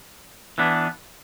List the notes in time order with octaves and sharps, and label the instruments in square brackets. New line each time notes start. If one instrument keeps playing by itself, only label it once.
[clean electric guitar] E3 B3 D4